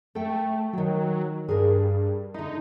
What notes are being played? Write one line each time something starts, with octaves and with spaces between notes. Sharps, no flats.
A3 A4 G5
D#3 F#3 G5
G2 G#4 A#4
D3 D#4 E4